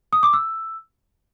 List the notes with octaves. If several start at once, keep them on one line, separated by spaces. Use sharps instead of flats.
D#6
D6
E6